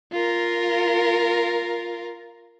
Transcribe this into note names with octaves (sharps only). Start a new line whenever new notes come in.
F4 A#4